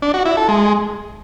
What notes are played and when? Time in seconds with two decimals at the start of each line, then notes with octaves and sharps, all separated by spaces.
0.02 D4
0.14 F#4
0.25 E4
0.37 A4
0.49 G#3